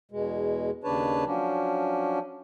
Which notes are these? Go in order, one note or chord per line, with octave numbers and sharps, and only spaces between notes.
E2 B2 G#3
D#2 C#3 D4 B4 C#5 A5
F3 F#3 C#4 D4